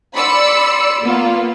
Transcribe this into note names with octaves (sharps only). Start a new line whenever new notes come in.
D5 B5 C6 E6 C#7
A#3 B3 F4